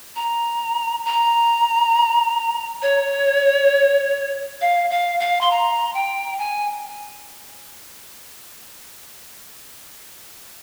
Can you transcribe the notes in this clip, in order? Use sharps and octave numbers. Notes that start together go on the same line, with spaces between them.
A#5
A#5
C#5
F5
F5
F5
C6
A#5
G5
G#5